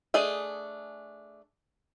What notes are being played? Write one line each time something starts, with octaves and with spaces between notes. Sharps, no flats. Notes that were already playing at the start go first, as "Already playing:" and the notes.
A3 D4 G#4 D#5